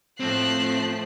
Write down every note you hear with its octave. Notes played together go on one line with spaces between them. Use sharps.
A2 F3 A3 C4 F#6 C7